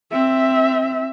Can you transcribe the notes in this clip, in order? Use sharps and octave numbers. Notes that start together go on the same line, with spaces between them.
C4 E5